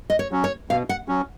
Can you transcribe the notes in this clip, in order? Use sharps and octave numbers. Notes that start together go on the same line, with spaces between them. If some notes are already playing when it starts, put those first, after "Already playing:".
D#5
C#5
F#3 C#4
C#5
B2 F5
F#5
F#3 C#4